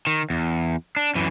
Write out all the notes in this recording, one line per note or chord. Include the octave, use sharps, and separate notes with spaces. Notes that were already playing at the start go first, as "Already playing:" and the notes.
D#3
E2
D4
F#2 E3